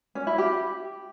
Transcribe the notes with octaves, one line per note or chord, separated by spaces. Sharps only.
C#4
E4
G4